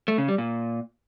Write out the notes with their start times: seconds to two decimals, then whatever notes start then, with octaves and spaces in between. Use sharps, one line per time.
0.08 A3
0.18 C#3
0.28 G3
0.38 A#2